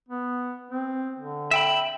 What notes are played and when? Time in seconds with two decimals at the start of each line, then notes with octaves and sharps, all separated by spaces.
0.09 B3
0.71 C4
1.19 D3
1.51 E5 G5 B5